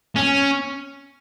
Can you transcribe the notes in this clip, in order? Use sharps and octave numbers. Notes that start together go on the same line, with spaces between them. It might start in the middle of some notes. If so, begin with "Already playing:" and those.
C#4